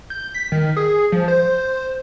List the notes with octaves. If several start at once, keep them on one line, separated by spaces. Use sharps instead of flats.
G6
B6
D#3
G#4
F3
C5